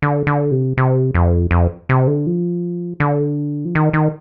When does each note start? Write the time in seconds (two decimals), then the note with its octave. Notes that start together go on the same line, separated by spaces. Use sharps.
0.02 D3
0.27 D3
0.51 C3
0.77 C3
1.14 F2
1.51 F2
1.89 C3
2.07 D3
2.27 F3
3.00 D3
3.65 F3
3.75 D#3
3.93 D#3